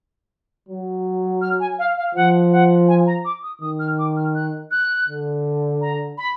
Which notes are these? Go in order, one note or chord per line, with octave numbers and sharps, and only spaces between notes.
F#3
F6
G#5
F5
F5
F3 F#5
F#5
G#5
A#5
D6
D#6
D#3 D#6
F6
D6
F6
F#6
F#6
D3
A#5
B5